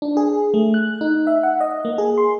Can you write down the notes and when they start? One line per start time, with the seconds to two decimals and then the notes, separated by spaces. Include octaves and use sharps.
0.02 D4
0.17 G#4
0.54 A3
0.74 F#6
1.01 D#4
1.27 E5
1.43 F#5
1.61 D#5
1.85 A#3
1.98 G#4
2.18 C6